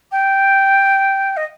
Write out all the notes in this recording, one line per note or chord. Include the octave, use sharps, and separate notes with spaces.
G5
D#5